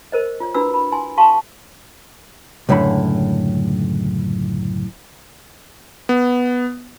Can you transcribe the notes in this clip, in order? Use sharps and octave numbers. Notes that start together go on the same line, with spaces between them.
A#4 C5 D#5
F4 C#5
D4 E4 F#4 B4 B5 E6
B5
E4 G#5 C6
G4 F5 A5 C6 C#6
C#2 F#2 A2 D3 B5
B3